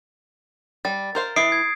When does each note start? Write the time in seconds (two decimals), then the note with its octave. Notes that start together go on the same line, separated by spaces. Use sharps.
0.85 G3 A6
1.15 A#4 C5 F5
1.36 E3 E4 E5 D#6 C7 D7
1.52 G#6